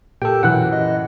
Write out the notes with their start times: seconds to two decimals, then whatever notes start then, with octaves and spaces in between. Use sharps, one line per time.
0.22 A#2 G4 A4 A#4 G5 A5
0.43 F#2 B2 E3 F#5 F#6
0.73 D#5